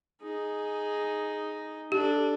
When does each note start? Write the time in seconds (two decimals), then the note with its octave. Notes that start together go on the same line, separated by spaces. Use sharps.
0.22 D#4 G#4
1.92 D4 G4 A4